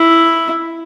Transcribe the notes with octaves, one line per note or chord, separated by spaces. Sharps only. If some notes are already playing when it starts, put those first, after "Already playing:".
Already playing: E4